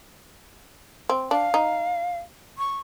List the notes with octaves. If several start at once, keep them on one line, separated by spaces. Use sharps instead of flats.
C4
D4 F5
D#4
C#6